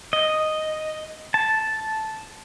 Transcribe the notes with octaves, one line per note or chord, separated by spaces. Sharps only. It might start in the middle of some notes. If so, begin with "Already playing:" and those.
D#5
A5